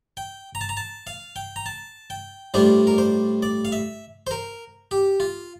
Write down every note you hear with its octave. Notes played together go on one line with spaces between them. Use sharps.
G5
A#5
A5
A#5
A5
F5
G5
A#5
A5
G5
A2 G3 D4 F4 C5
A#4
C5
D5
F5
E5
C5
A#4
G4
F4